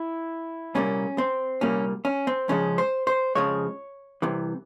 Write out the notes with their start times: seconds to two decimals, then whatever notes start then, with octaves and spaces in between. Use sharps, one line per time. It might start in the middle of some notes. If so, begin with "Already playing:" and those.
Already playing: E4
0.75 C2 A#2 G3 A#3 C#4
1.18 C4
1.61 C2 A#2 G3 A#3 C#4
2.05 C#4
2.27 C4
2.48 F2 C#3 F3 G#3 C#4
2.78 C5
3.07 C5
3.35 F2 C#3 F3 G#3 C#5
4.22 C2 C3 E3